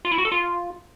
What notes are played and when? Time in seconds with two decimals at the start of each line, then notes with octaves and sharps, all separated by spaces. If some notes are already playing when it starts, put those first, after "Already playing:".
0.05 F4
0.11 E4
0.18 F#4
0.25 A4
0.32 F4